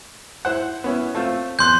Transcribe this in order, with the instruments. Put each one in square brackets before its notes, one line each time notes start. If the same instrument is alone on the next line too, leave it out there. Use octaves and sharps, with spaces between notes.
[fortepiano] E4 C5 F#5
B3 C#4 E4
A3 C4 F4
[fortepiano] E2 F#6 [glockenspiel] C6 G6